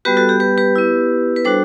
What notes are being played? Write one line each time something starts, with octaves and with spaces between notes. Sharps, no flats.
G3 B3 F#4 G4 B4
F#4 A4
G4
G4 B4
G4 B4
B3 E4
B4
G3 D4 F#4 A4 C5